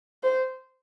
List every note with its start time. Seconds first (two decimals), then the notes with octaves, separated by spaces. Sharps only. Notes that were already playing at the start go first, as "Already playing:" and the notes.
0.23 C5